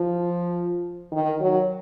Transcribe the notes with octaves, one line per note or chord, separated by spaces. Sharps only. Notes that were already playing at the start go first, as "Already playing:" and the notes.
Already playing: F3
D#3
F#3